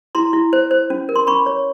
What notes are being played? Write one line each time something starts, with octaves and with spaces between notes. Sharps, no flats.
E4 A#5 C6
E4
C5
C5
C#4
A#4
C6
C#4 B5 C#6
C#5